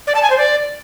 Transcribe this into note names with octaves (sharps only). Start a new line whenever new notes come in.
D5
A5
G#5
C5
D5